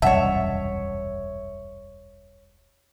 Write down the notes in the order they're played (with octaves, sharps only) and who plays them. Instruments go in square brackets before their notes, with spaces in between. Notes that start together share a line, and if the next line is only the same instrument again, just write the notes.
[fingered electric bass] E1 C2 F#2 [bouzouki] C#5 E5 [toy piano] D#5 F#5 A5